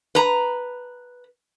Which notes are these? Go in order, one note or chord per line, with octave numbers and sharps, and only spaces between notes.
B4 A#5